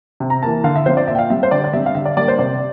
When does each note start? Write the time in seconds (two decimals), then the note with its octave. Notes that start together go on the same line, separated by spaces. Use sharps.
0.20 C3
0.30 A#5
0.42 E3 A#3 A5
0.64 D3 F5
0.76 E5
0.86 F3 C4 C5
0.97 D5
1.08 A#2 E5
1.15 G5
1.19 F5
1.30 G3 C4 E5
1.43 C5
1.51 D3 D5
1.64 D5
1.73 G3 C4 E5
1.86 F5
1.95 D3 E5
2.06 D5
2.17 G3 A#3 D5
2.28 C5
2.39 C3 D5